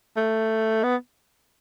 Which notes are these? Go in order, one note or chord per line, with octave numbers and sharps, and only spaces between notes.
A3
B3